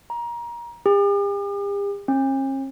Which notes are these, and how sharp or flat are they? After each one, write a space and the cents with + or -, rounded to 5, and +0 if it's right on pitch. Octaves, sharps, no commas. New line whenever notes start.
A#5 +25
G4 +45
C#4 -45